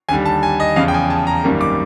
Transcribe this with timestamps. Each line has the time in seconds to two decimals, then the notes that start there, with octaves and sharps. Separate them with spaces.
0.09 D#2 D3 G3 G#5
0.26 A5
0.43 G#5
0.60 D#5
0.76 E2 C#3 F3 F5
0.88 G5
0.94 G#5
1.10 A5
1.27 A#5
1.44 G#1 F#2 D#3 G3 A#3
1.61 D6